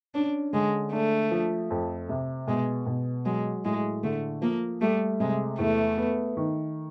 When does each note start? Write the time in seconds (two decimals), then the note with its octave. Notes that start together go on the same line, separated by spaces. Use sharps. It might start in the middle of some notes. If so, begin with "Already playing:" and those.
0.15 C#4 D4
0.53 D3 G#3
0.92 A3 D4
1.31 F3
1.70 F2
2.09 C3
2.47 B2 G#3
2.86 B2
3.26 F#3 G#3
3.65 A2 G#3
4.03 D3 A3
4.42 F3 A#3
4.81 G3 A3
5.20 C3 G#3
5.59 E2 A3
5.98 B3
6.37 D#3